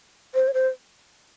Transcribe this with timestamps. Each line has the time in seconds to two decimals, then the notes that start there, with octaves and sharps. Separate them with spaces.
0.35 C5
0.48 C#5
0.54 C5